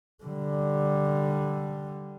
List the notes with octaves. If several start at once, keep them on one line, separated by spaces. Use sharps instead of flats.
D3 G3